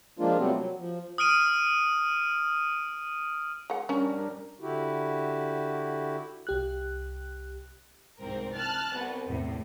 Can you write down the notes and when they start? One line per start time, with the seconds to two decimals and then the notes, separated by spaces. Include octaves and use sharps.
0.19 F3 G#3 A#3 D4 F4
0.38 C3 F#3 G3 A3 B3 C4
0.54 F#3
0.78 F3
1.18 D#6 F6 D7 D#7
3.70 G#3 F#5
3.89 G3 C#4 D4 A#4
4.61 D3 E4 F#4 G4
6.47 C2 G4 F#6
8.19 C2 G#2 C4 A#4
8.56 A5 F6 F#6 A6
8.94 C2 B3
9.28 E2 A2 C3